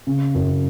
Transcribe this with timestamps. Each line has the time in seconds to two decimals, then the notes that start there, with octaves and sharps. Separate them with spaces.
0.07 C#3
0.35 F#2